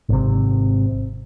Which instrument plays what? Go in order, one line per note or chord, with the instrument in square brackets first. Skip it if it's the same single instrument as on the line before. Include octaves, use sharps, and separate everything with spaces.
[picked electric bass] G#1 C3